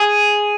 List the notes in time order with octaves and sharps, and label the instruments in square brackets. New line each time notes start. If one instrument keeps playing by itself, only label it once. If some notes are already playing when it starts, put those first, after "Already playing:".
Already playing: [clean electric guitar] G#4